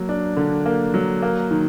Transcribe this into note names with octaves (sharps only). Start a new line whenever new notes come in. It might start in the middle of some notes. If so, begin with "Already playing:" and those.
Already playing: F#3 A#3
D4
D3
A#3
F#3
A#3
D#3